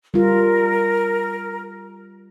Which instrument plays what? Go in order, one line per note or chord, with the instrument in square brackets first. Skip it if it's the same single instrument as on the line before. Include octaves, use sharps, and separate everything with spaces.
[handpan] G3 F4 [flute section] A#4